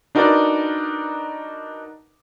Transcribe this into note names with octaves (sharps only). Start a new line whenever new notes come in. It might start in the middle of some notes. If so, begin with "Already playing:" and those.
D4 D#4 F#4 A#4 B4 D5